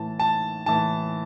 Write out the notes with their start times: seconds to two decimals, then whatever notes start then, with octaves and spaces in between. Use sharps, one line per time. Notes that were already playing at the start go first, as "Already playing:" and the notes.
Already playing: A2 E3 A5
0.19 A5
0.66 A2 E3 A5